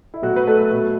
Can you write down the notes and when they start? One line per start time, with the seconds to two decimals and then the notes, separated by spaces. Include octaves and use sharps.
0.14 E4
0.22 B2 F#3 A3 F#4
0.36 B4
0.47 A3 A4
0.71 B2 F#3 A3